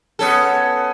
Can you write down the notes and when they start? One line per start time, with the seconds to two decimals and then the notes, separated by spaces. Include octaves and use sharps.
0.19 B3 C#4 A4